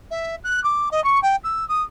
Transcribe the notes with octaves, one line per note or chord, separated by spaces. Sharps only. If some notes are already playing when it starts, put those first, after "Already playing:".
E5
F#6
D6
D#5
C#6
G5
E6
D#6